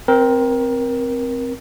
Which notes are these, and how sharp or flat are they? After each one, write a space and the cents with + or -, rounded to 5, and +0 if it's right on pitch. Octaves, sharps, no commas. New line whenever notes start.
C4 +0 A#4 +20